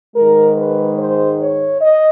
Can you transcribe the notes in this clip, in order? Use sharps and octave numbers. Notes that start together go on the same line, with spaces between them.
G#2 D#3 G#3 A#4
B4
C5
C#5
D#5